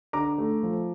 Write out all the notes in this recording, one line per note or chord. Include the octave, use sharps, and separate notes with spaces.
D3 A#5 D6
A3
F3